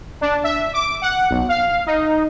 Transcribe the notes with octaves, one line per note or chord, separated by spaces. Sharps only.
D4
E5
D6
F#5
B1
F5
D#4